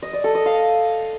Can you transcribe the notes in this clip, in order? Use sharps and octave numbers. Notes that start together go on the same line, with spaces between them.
D#5
D5
A4
D#5
F5